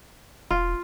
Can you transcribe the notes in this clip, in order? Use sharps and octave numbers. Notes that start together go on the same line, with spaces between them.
E1 F4